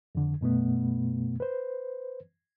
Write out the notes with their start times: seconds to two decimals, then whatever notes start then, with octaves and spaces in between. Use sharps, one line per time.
0.15 F2 D3
0.41 F#2 B2 A3 B3
1.40 B4 C5